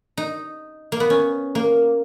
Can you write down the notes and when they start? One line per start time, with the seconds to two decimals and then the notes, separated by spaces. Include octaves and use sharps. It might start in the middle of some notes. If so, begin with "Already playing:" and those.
0.17 D#4
0.92 A#3
1.00 B3
1.10 C#4
1.55 A#3